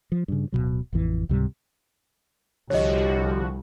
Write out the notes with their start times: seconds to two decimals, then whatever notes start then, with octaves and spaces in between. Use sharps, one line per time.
0.12 F3
0.28 G2 C#3
0.52 D1 C#2 B2 F#3
0.93 A1 F2 E3
1.29 C#2 G#2 C3 G3
2.70 C2 D3 F3 F#4 G4 C#5 D#5